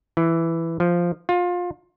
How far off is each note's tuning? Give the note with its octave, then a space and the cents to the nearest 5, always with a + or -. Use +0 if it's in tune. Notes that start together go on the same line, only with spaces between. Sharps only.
E3 +5
F3 -5
F4 +25